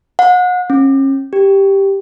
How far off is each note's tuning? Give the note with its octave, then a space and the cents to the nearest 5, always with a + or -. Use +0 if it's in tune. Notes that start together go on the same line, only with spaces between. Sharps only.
F#5 -35
C#4 -35
G4 +0